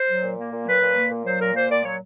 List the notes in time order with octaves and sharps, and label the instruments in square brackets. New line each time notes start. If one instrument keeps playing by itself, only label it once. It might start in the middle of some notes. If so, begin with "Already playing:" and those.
Already playing: [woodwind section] C5
F#3
A#2
A#3
A#2
F#3 B4
A#2
A#3
A#2
F#3 C5
A#2 A#4
A#3 C5
A#2 D5
F#3 C#5